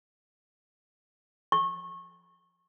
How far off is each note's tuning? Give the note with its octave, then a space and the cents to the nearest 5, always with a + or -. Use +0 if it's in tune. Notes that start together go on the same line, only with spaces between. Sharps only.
C#6 -25